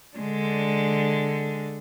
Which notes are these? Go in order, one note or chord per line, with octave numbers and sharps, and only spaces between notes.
D3 G#3 D4